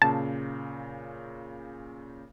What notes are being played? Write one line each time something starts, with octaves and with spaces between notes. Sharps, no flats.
A#2 C#3 A5